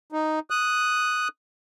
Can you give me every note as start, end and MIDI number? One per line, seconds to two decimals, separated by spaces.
0.12 0.39 63
0.50 1.28 87
0.50 1.28 90